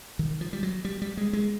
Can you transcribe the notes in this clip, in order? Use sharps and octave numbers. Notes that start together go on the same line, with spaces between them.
D#3
F3
G3
F#3
G3
G3
G#3
G#3